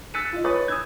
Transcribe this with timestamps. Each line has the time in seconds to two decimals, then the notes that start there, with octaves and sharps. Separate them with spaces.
0.14 E6 F#6 A6 B6 C#7 D#7
0.33 F4 D#5
0.44 B4 C#5 B5 C#6 D#6 A6
0.68 D#6 E6 G#6